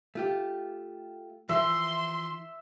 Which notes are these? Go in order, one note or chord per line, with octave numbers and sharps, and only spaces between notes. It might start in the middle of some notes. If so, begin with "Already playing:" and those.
A3 F4 G4
E3 F3 E5 C6